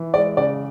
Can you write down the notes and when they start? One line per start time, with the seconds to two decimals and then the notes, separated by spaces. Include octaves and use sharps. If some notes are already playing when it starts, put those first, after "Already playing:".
Already playing: E3
0.14 G#3 D5
0.37 C#3 D5